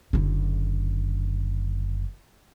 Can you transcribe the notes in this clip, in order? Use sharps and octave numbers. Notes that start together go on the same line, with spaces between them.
F#1 D3